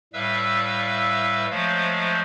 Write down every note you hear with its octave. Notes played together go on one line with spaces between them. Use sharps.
A2 G3 B4 E5 F5 E6
F3 F#3 G#3 A3 C5 F5